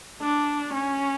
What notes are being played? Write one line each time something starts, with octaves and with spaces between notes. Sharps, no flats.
D4
C#4